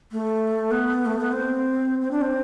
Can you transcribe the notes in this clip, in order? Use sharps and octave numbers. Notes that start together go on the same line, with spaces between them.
A3
B3
A3
B3
C4
C4
D4
C4